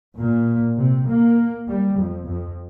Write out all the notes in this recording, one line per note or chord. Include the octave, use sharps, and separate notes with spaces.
A#2
C3
A#3
G3
F2
F2